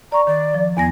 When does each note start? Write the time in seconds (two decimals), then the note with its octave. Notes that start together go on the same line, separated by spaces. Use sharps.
0.12 D5 A#5 C#6
0.27 D#3 D5
0.54 F3
0.77 E2 B3 G#5 A#6